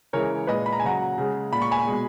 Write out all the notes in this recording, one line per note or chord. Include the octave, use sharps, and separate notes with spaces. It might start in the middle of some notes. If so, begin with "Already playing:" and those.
C#3 E3 G#3 A#4 C#5
A#2 G#3 B4 D#5
B5
A#5
G#5
C#3 F#3 F#5 A#5
C#3 G#3
A#2 G#3 B5
C#6
G#5 B5
B2 G#3